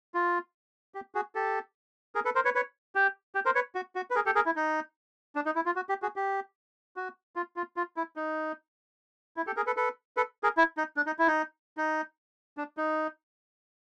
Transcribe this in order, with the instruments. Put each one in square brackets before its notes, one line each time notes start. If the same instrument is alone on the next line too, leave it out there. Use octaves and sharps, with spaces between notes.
[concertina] F4
G4
F#4 G#4
G4 A4
G#4 A#4
A4 B4
A#4 C5
B4 C#5
B4 C#5
G4
G4
A#4 C5
B4 C#5
F#4
F#4
B4
G#4 A#4
G4 A4
G#4 A#4
E4
D#4
D4
D#4
E4
F4
F#4
G4
F#4 G#4
G4
F#4
F4
F4
F4
E4
D#4
E4
G4 A4
G#4 A#4
A4 B4
A4 B4
A4 B4
G#4 A#4
E4
D#4
D4
D#4
E4
D#4
D#4
D4
D#4